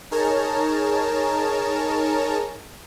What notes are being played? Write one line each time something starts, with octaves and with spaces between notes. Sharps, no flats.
D#4 G#4 A#4 C#5 A5 A#5